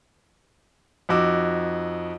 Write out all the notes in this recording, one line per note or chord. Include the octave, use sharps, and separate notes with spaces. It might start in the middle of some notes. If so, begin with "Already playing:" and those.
F2 D#4 F#4 D6 E6